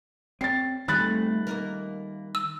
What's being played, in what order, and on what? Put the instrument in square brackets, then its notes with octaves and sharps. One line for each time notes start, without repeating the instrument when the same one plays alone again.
[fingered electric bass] C4 [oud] C#4 G4 [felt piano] A6 C7
[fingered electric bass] D#3 G3 [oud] A3 C4 G#4 [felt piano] B5 F#6 A6
[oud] A#3 D#4 A#4
[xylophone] E6